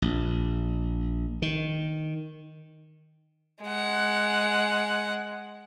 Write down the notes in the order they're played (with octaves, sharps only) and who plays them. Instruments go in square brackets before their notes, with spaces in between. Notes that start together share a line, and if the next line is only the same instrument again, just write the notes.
[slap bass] A#1
D#3
[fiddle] G#3 F#5